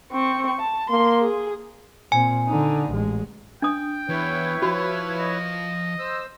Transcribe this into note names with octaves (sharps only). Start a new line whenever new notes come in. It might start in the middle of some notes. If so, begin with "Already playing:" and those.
C4 C#6
A5
A#3 C6
G#4
A#2 C4 G#5
D3 D#4
A1 G#3
D4 G5 D#6
E2 E4 B4 C#5
F3 F4 F#4
D#5
C5 E6